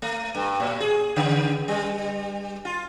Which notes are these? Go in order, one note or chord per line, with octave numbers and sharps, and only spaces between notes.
A3
G2
A2
G#4
C#3
G3
F4